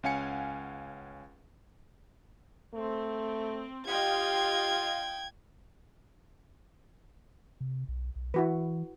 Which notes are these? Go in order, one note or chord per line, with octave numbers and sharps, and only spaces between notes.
C#2 C#4 F5 F#5 G#5 C#7
A3 C4
F4 G4 D#5 F5 G5 G#6
C3
B1
B1
E3 E4 F#4 B4